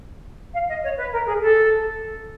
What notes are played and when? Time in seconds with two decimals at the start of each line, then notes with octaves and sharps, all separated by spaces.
0.53 F5
0.68 D#5
0.84 C#5
0.98 B4
1.13 A#4
1.27 G#4
1.42 A4